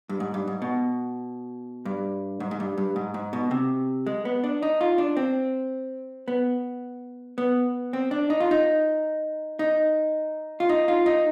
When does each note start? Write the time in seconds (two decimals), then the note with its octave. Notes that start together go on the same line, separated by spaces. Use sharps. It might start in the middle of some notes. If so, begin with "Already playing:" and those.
0.09 G2
0.20 G#2
0.34 G2
0.47 G#2
0.62 B2
1.85 G2
2.40 G#2
2.51 G#2
2.60 G2
2.78 G2
2.96 G#2
3.14 G#2
3.33 B2
3.51 C3
4.07 G#3
4.25 B3
4.44 D4
4.62 D#4
4.81 F4
4.98 D4
5.17 C4
6.28 B3
7.38 B3
7.93 C4
8.11 D4
8.30 D#4
8.40 F4
8.51 D#4
9.59 D#4
10.60 F4
10.69 D#4
10.88 F4
11.06 D#4